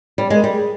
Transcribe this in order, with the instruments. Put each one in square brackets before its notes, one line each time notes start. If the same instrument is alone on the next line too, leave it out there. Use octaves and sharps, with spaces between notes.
[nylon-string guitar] G3
[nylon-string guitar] G#3 [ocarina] A#4
[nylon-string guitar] G3
[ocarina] G#4